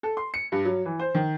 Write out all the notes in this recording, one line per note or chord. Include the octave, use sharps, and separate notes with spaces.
A4
C6
C#7
G2
F#3
E3
C5
D#3